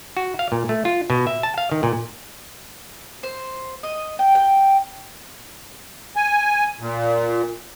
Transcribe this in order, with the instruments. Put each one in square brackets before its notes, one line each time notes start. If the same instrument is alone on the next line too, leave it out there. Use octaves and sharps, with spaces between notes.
[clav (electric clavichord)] F#4
F5
A#2
A3
F4
B2
E5
A5
F5
D#3
A#2
[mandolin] C5
D#5
G5
G5
[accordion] G#5
A#2